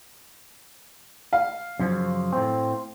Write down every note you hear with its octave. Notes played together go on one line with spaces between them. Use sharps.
F5
F#2 C#3 F3
A2 C4